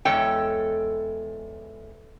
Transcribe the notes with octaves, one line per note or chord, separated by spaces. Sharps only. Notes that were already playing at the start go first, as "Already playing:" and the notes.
E2 G#3 A4 C#5 G5